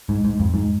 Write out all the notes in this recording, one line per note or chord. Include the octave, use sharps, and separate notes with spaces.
G#2
G#2
F2
G#2